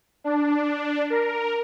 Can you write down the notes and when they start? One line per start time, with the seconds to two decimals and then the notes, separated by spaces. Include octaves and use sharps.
0.24 D4
1.10 A#4